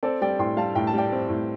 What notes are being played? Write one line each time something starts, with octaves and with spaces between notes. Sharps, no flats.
C4 A4 D5
G3 D5 G5
A2 G5 C6
G3 F5 A5
A2 G5
A5
G3 D5 G5
C4
A2